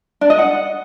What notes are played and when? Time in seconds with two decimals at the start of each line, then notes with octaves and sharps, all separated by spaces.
0.21 D4
0.30 D#5
0.39 F#5